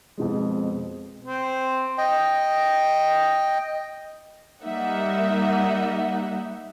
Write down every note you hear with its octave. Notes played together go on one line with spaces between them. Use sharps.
F2 B2 G#3
C4
D#5 G5
G3 A#3 D#4 E5 F#5